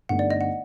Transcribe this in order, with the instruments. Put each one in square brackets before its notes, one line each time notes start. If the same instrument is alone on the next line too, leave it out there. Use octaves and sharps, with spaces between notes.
[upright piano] G1 G2 D3 A3 D#4 [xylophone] F#5
[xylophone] D5
D#5
F#5